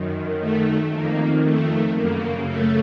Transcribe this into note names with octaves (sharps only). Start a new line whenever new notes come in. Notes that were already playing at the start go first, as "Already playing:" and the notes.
Already playing: F#2 D#3
A3
F2 D#3 A#3
A3
F#2 C#3 A#3
A3